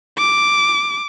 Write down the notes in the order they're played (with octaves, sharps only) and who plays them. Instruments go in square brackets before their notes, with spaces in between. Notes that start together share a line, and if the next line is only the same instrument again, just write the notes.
[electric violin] D6